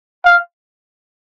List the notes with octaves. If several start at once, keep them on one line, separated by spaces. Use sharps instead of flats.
F5